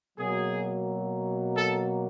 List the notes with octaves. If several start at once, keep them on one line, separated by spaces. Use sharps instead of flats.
B2 F#3 A#3 G#4
A4